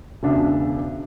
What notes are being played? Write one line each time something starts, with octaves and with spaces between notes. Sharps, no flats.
E1 C#2 D4 E5